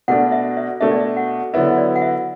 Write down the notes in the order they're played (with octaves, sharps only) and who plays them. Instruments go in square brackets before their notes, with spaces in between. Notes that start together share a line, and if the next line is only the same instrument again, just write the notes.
[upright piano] B2 A3 D4 [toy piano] F#5
[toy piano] E5
E5
[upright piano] B2 A3 D4 [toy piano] E5
[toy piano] D5
E5
F#5
[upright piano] D3 F#3 B3 E4 [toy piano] E5
[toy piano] D5
F#5
E5